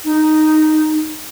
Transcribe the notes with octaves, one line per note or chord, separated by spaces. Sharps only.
D#4